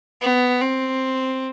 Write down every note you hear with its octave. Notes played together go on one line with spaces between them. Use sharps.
B3
C4